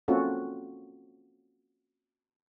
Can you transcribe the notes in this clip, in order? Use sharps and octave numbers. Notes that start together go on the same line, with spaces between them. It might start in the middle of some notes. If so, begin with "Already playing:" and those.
A#3 C4 C#4 F4 F#4 A4